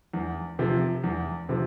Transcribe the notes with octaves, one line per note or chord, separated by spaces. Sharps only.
E2
C3 F3
E2
C3 F3